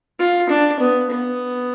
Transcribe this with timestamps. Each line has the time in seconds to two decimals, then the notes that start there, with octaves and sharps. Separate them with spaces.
0.19 F4
0.50 D4
0.80 B3
1.10 B3